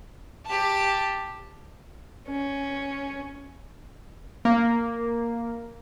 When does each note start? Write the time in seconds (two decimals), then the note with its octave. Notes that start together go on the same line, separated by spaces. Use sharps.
0.46 G4 A5
2.28 C#4
4.45 A#3